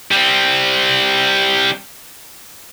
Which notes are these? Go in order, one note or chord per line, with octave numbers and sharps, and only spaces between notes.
G3 C4